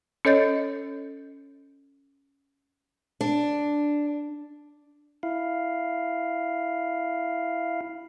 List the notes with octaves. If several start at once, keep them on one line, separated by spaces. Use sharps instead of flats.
C#4 A4 C#5 D#5 G6 A6
D4
E4 F5